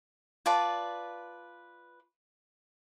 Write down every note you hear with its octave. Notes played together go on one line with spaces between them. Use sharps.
F4 B4 D5 A5